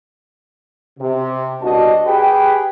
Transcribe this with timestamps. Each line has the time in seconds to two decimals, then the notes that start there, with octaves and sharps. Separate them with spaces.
1.00 C3
1.62 C2 B2 D4 F#4 D#5 A5
2.07 G4 G#4 B4 G5